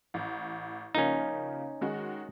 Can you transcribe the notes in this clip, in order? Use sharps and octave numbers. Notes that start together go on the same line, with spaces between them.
A1
C#3 F3 A#3 C#4 D#4
D#3 G#3 F#4